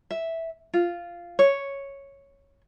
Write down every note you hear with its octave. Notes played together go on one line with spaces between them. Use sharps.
E5
F4
C#5